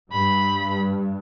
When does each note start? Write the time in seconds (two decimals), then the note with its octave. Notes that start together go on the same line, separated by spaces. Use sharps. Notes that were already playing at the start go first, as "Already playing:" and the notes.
0.12 G2 B5